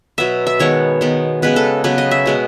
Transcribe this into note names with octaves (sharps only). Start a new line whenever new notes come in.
B2 F#3 B3 E5
E5
D#3 G#3 B3 C#5
D#3 G#3 B3
C#3 G#3 B3 B4
A4
C#3 F#3 B3 B4
D#5
E5
B2 G#3 B3